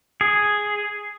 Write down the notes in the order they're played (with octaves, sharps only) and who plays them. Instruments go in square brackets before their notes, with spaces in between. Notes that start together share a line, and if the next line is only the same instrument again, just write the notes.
[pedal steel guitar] G#4